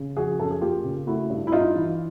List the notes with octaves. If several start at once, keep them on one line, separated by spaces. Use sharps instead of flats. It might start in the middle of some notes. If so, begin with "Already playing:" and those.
Already playing: C#3
F3 F#4 G#4
F#2 A4
G#4
A#3 F4 G4
C#3
A3 E4 F#4
G2
E4
G2 D#4 F4
E3